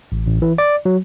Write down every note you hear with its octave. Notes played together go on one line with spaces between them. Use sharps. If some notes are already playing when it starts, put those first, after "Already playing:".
A1
A1
E3
D5
F#3